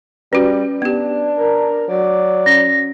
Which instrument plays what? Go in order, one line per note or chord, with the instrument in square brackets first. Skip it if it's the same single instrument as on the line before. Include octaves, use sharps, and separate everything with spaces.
[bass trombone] G3 [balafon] C#4 F#4 [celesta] B4
[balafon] B3 G4 [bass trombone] D4
[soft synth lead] A#4
[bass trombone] F#3 [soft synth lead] D5
[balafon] C#4 [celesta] A#6